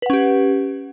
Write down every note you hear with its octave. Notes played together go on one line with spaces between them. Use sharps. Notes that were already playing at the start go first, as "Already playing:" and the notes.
C#4 G4 B4 F#5